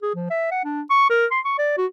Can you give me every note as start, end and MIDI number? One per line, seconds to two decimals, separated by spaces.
0.02 0.15 68
0.15 0.25 53
0.30 0.48 76
0.51 0.63 78
0.65 0.82 62
0.90 1.09 85
1.10 1.26 70
1.31 1.40 84
1.45 1.55 85
1.58 1.77 74
1.77 1.86 66